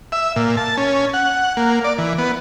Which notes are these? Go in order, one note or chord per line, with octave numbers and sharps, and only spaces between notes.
E5
A#2
A5
C#4
F#5
A#3
D5
E3
B3